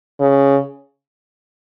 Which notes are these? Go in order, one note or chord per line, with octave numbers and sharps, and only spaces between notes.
C#3